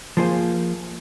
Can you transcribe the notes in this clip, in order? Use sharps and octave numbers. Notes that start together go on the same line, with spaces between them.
F3 A#3 F4 G#4 C5